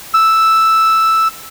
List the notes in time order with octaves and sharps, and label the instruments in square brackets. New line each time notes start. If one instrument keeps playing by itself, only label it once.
[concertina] E6